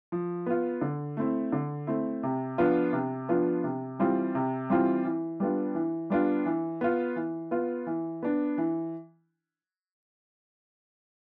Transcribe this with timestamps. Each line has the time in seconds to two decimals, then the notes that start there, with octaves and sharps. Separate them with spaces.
0.12 F3
0.46 B3 F4
0.81 D3
1.17 A3 C4 E4
1.52 D3
1.87 A3 C4 E4
2.23 C3
2.58 F3 B3 D4 F4
2.93 C3
3.29 F3 B3 D4 F4
3.64 C3
3.99 E3 G3 C4 F4
4.35 C3
4.70 E3 G3 C4 F4
5.05 E3
5.40 G3 B3 D4 F4
5.75 E3
6.10 G3 B3 D4 F4
6.46 E3
6.81 B3 F4
7.16 E3
7.51 B3 F4
7.87 E3
8.23 B3 D4
8.58 E3